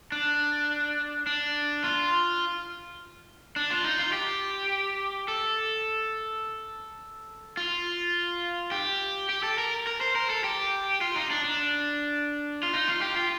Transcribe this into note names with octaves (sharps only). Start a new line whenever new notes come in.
D4
D4
F4
D4
F4
D#4
F4
G4
A4
F4
G4
G4
A4
A#4
A#4
C5
A#4
A4
G4
F4
D#4
D4
D4
F4
D#4
F4
G4
F4